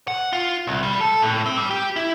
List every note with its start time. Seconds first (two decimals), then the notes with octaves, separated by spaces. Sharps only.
0.08 F#5
0.33 F4
0.67 C2
0.83 G3
1.01 A4
1.22 A2
1.46 C4
1.57 G3
1.70 G4
1.96 E4